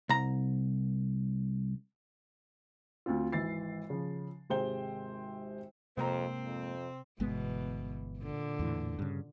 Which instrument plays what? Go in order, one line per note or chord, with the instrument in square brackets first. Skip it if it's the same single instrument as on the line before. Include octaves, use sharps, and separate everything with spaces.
[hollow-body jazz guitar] C2 A#5
[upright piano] D2 C4 F4
G#1 E3 A6 C7
C#3 F3
G#1 C3 G#4 C5 G5 G7
[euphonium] F2 [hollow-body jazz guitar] G#2 A#3 A#5 [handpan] C3 [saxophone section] C4
[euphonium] F2
[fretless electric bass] G1 G#3 B3 [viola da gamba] B2 E3
[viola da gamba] A#2 D3
[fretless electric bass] E2 A2 E3
G2 C#3